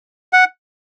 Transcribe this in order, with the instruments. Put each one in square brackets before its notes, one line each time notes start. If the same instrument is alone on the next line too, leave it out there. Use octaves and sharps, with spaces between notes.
[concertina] F#5